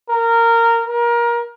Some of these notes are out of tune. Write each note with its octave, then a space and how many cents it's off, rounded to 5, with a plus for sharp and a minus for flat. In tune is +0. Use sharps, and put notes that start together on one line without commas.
A#4 -15
A#4 +25